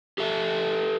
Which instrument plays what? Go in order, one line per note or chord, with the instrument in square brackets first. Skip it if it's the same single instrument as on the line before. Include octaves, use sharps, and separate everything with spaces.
[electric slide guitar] G4 A4 E5